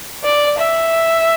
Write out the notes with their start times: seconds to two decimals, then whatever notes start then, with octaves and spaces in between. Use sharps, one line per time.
0.24 D5
0.58 E5